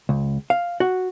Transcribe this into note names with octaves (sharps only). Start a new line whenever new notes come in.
C#2
F5
F#4